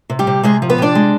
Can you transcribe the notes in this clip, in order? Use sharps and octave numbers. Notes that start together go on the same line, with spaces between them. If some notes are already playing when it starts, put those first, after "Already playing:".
C3
G3 G4
C3
C3 G#3 G#4
F3
B3 B4
C3 D4 D5
G#3